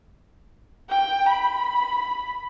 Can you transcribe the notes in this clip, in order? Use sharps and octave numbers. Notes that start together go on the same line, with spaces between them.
G5
B5